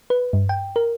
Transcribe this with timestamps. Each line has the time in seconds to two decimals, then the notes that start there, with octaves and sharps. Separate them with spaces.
0.10 B4
0.33 G2
0.49 G5
0.76 A#4